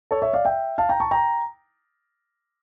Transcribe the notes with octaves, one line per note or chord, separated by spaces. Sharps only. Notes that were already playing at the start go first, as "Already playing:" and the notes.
A4 C#5
C#5 E5
D5 F5
E5 G5
F5 A5
G5 A#5
A5 C#6
G5 A#5